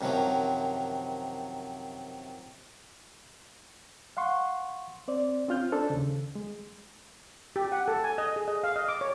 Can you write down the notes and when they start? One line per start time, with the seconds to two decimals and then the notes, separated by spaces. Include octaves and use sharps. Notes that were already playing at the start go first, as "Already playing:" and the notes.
0.01 F#2 C3 D#3 F3 F#3
4.17 F5 F#5 C6 C#6
5.08 C4 C5 D5
5.48 C4 C#4 F4 F6 G6
5.72 C#4 D4 A4 C5
5.90 D#2 C#3
6.35 G#3
7.56 G4
7.72 F#5
7.88 A4
8.04 G#5
8.18 D#5
8.36 G#4
8.48 D#5
8.64 F5
8.76 D#5
8.88 D6
9.01 C#5